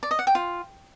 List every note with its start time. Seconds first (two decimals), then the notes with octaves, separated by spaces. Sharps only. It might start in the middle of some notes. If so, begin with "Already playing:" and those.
0.03 D5
0.11 D#5
0.19 F#5
0.27 G5
0.35 F4